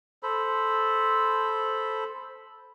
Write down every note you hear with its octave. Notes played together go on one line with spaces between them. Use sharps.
A4 C5 B5